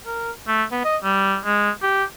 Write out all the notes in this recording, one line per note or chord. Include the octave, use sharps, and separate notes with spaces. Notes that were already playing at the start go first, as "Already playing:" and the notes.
A#4
A3
B3
D#5
G3
G#3
G4